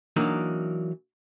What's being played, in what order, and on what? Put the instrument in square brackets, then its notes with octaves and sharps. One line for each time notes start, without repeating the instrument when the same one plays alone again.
[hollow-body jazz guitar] E3 F#3 A#3 D4 D#4